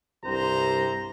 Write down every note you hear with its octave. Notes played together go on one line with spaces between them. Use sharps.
C2 G2 C3 C5 A#5